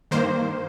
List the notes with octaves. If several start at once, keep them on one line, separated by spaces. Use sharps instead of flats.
G2 D#3 A#3 C5